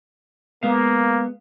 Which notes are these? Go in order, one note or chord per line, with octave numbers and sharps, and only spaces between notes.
G#3 A#3 B3 F5